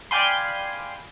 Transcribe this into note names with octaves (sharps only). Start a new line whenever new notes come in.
D5 F5 G5 G#5 B5 C6